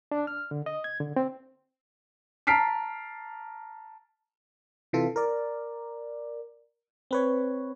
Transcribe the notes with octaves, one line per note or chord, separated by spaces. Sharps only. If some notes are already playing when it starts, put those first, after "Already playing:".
D4
F6
D3
D#5
G#6
D3
C4
A5 A#5 F6 B6 C7 D7
C3 E3 F4 A4
A#4 D5
C4 B4 C#5